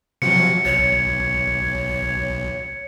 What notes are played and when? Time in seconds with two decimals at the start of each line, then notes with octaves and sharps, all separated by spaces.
0.22 C3 F3 F#3 C#7
0.65 B1 C#5